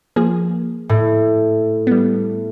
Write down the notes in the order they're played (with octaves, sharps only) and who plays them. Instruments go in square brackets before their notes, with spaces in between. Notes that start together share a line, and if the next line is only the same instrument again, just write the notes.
[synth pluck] F3 A#3 G#4
[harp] A2
[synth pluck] G3 B3